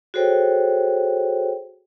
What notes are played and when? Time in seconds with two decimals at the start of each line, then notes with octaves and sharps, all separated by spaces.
0.14 F#4 G#4 A4 C5 C#5 G5